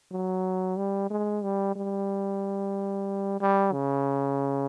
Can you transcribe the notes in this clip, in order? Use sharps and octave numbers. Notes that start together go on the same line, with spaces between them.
F#3
G3
G#3
G3
G3
G3
C#3